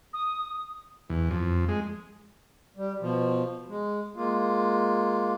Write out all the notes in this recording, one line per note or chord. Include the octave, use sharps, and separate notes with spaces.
D#6
E2
F2
G#3
G3
B2 F3
G#3
G#3 A#3 F4